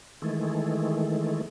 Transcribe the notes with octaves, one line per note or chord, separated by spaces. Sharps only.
D#3 E3 G#3 A3